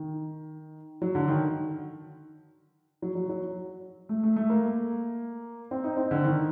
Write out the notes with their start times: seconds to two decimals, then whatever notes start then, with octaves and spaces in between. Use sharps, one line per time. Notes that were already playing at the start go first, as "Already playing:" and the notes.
Already playing: D#3
1.02 F#3
1.15 D3
1.28 D#3
3.02 F#3
3.15 F#3
3.29 F#3
4.09 A3
4.23 A3
4.36 A3
4.50 A#3
5.71 C4
5.84 D#4
5.97 C4
6.11 D3
6.24 D#3